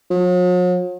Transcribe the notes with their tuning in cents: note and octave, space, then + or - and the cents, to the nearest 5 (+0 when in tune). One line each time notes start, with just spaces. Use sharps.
F#3 -45